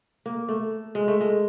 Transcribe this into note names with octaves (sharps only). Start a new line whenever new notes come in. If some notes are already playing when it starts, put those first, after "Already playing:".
A#3
A3
G#3
A3
G#3